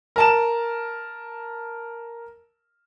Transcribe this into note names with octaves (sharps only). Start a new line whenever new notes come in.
A#4 A5 E7